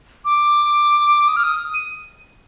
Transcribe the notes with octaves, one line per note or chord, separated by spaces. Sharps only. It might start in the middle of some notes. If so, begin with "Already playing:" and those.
D6
D#6
F6
D#6
D#7